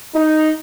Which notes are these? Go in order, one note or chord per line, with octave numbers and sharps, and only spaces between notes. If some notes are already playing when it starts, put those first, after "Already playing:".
D#4